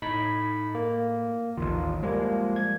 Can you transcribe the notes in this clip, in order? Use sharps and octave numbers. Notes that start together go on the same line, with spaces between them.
A2 D#4 B5 B6
A#3
A1 D#2 D#3 F4
F3 G3 G#3 A#3
G#6